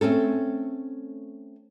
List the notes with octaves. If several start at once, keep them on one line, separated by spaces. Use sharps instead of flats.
A3 C4 C#4 A4